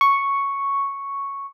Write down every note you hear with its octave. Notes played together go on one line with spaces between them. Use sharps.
C#6